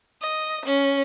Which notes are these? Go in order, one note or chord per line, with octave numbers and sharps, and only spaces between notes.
D#5
C#4